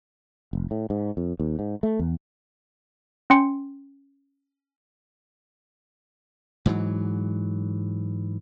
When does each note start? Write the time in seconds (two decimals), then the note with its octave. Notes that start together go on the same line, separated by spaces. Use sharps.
0.53 F1
0.71 A2
0.90 G#2
1.17 F2
1.40 D#2
1.59 G#2
1.83 A3
1.99 E2
3.30 C#4 G5 C6 C#7
6.66 G#2 E3 F#3